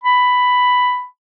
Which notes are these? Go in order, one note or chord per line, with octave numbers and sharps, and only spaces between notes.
B5